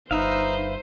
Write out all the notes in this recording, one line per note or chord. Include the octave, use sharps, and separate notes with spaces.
G1 D#4 B4 C5 E5 F5